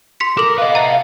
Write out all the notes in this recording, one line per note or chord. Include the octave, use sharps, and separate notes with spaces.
C6 B6 C#7
A4 A#4 D6 F#7
B4 D#5 F5
E5 A#5